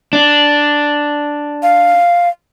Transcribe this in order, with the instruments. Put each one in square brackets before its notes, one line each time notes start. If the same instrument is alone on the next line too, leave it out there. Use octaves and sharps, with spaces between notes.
[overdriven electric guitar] D4
[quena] F5